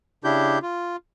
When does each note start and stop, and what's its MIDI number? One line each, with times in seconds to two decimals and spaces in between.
0.24 0.59 49
0.24 0.59 62
0.24 0.59 64
0.24 0.59 67
0.24 0.59 91
0.62 0.96 65